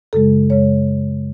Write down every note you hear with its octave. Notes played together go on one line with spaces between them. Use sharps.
F#2 C#3 G#3 A4
F#2 C#3 G#3 C#5